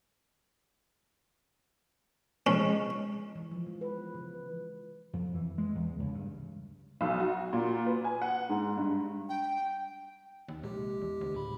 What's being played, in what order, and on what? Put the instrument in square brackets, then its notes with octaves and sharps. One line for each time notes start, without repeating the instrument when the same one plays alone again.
[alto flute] G#3 [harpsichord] C#4
[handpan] E3
F3
G#3
B4
C#3
[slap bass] F2
E3
G#3
E2
C#2
G2
[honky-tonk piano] B1
F#4
A#2
B4
G#5
F#5
G#2
G2
[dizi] G5
[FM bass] D#2
[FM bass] A#1 [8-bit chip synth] C3 G#3 G4
[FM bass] E2
D2
[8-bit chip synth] A2 C#3 B5